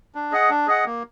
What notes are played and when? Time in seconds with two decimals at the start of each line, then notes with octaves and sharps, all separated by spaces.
0.15 D4
0.32 G#4 D#5 F#5
0.49 D4
0.67 G#4 D#5 F#5
0.85 A#3